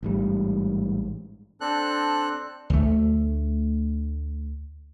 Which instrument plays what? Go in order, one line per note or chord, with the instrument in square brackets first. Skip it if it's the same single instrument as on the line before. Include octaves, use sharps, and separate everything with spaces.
[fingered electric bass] A1 G#2 G3
[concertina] C4 D4 A4 F#6
[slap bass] D2 A3